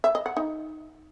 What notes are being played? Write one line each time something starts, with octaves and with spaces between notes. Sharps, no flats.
E5
D#5
F#5
D#4